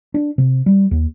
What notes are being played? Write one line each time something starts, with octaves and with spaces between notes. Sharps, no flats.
D4
C3
G3
D#2